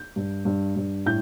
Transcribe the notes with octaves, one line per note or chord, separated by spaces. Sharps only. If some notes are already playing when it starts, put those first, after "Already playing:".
Already playing: G6
G2
G2
G2
A2 G6